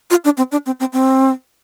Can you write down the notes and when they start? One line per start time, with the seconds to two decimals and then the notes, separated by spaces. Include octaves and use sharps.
0.10 F4
0.25 D4
0.37 C4
0.52 D4
0.66 C4
0.80 C4
0.93 C4